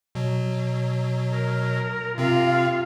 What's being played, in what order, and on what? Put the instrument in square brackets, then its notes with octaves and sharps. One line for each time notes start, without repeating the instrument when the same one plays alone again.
[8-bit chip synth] B2 F#3
[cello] A#4
[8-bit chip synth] C3 C4 [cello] F4 F5